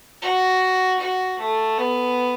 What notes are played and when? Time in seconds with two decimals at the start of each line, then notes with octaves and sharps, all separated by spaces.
0.22 F#4
1.00 F#4
1.39 A3
1.78 B3